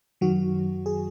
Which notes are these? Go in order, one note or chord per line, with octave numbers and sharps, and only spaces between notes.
F#2 D#3 F#3 F#4
G#4